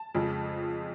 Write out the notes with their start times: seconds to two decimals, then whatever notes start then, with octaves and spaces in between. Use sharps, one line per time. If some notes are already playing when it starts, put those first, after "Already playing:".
Already playing: A5
0.15 F2 C#3 F3 G#3